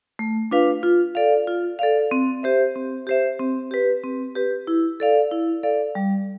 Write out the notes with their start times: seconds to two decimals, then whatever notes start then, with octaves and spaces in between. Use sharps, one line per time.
0.19 A3
0.51 D4 F4 B4 F5
0.83 F4
1.15 A4 D5 F5
1.47 F4
1.79 A4 D5 F5
2.11 C4
2.43 G4 C5 E5
2.75 C4
3.07 G4 C5 E5
3.39 C4
3.71 G4 B4
4.04 C4
4.35 G4 B4
4.67 E4
5.00 A4 D5 F5
5.32 E4
5.63 A4 D5 F5
5.95 G3